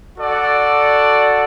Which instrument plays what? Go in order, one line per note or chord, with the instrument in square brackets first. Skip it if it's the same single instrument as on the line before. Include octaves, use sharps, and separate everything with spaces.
[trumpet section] F#4 A4 D5 F#5